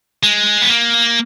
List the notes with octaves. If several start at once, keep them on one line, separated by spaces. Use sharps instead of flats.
G#3
B3
A#3